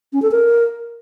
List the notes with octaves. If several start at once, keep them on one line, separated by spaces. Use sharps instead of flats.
C#4
A4
A#4